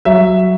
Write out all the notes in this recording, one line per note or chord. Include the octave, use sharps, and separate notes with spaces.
F#3 E5